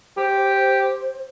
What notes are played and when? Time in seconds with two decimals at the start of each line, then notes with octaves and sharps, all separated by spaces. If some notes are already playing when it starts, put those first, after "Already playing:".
0.17 G4 C5